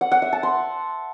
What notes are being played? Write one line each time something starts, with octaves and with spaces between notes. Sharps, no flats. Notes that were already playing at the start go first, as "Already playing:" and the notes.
F#5
F#5
E5
A5
C6